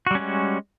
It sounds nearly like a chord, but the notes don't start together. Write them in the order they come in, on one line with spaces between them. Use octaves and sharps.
F#4 G3 C#4 G#3